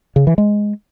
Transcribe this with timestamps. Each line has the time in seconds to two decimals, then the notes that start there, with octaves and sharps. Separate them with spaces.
0.16 C#3
0.27 E3
0.38 G#3